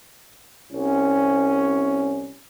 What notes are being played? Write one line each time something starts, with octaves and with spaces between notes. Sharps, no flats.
C2 C#4